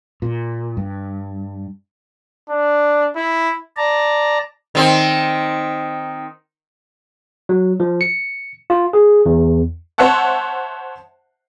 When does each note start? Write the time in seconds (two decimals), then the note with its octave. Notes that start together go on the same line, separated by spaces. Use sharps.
0.22 A#2
0.77 G2
2.50 D4
3.16 E4
3.77 D5 A5 A#5
4.75 D#3 C4
7.49 F#3
7.80 F3
8.01 C#7
8.70 F4
8.93 G#4
9.26 E2
9.98 C5 C#5 E5 F#5 A5